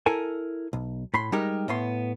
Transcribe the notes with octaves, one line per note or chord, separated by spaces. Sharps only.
E4 A4 A#4 G#5
B1
A2 B5 C6
G3 G#3 D#4 G4 A#4
A2 A3 B3 C6